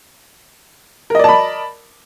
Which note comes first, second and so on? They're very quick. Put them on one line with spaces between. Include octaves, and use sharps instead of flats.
A#4 D#5 D5 A5 B5